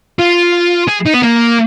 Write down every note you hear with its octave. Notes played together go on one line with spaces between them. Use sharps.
F4
G#4
D#4
B3
A#3